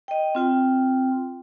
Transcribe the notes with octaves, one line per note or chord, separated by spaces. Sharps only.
D#5 G5
C4 F4 G5